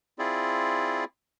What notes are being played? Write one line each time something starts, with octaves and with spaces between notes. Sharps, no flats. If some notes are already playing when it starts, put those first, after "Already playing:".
C4 E4 F4 G#4 D5